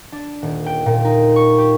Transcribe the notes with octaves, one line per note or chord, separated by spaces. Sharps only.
D4
D#1
G5
A#2
D#4
C#6
G4